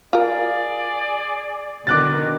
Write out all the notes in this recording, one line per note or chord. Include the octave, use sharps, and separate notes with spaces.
F4 G#4 A#4 D5
B2 D3 D#3 D6 F#6 A6